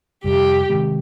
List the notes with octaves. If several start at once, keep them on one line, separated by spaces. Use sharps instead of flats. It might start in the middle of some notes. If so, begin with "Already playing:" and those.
F2 C3 G3 G4
C3 D#3 G#3 C4